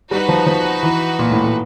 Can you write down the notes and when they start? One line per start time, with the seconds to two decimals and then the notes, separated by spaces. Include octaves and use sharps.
0.11 G3 D#4 F#4 B4
0.28 F3
0.47 F3
0.83 E3
1.19 A#2
1.31 A2
1.43 A2